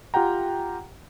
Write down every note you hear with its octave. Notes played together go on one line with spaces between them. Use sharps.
F4 G4 F#5 G5 A#5